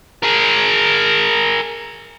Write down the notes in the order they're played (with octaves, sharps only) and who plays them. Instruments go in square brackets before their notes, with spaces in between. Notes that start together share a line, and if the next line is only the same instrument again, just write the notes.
[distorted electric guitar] G#4 A#4